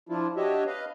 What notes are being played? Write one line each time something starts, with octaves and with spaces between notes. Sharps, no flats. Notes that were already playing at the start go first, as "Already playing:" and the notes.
F3 D4 E4 F4
D4 F#4 G4 C#5 D#5 E5
B4 D#5 F5